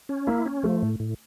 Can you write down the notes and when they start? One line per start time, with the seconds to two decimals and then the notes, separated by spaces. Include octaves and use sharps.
0.09 C#4
0.27 A#3 E4
0.46 C#4
0.63 F3 A3
0.82 A2
1.00 A2